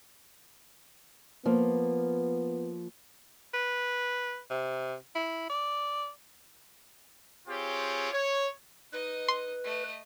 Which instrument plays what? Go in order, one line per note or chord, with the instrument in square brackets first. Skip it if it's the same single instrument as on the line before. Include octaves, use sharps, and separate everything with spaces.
[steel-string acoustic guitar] F3 A#3 [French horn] B3
[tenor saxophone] B4
C3
E4
D5
[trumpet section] C4 F4 G4 G#4 C#5
C#5
[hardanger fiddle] D#4 D#5 [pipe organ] B4
[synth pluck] C6
[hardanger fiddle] A3 D#5